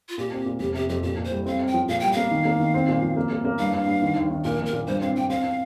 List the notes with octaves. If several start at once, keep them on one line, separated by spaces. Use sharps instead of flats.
F4
A#2 G4
C4
A#2
F1 G4
C3 G4
F2 G4
A#2 G4
A#2
C5
G3
C4 F5
C4
G5
F3
A#2 F5
G3 G5
A#3 F5
D#3
A#3
D#3
C4
A#2
F3
A#3
A#3
A#3
G2 F5
G2
G2
D#3
D#2
D#3
A#2 A#4
A#1
A#4
A#2
G2 C5
C4 F5
G2 G5
C4 F5
C4